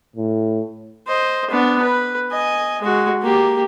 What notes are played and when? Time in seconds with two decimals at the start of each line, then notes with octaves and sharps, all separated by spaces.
0.16 A2
1.07 C5 D#5
1.50 B3 D4
1.82 B4
2.31 D#5 G#5
2.82 G#3 F#4
3.22 A#3 G4